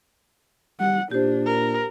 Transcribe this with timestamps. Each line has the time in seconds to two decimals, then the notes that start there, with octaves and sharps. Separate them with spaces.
0.80 G3 F#5
1.11 A#2 D4 G4 C5
1.46 A#4